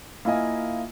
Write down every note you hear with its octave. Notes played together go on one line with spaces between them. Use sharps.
A#3 E4 F4 D#5 G#5